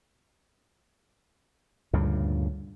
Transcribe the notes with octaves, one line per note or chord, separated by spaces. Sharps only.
D2 G2 A#2 C#3